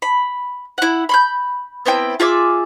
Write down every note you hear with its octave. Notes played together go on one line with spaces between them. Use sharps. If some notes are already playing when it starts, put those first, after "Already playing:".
B5
E4 F#5
B5 C6 G6
B3 C4 E4 G5
F4 G#4 E5 D6